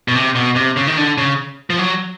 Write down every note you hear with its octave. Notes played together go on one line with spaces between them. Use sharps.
B2
C3
B2
C3
C#3
D#3
D3
C#3
F3
F#3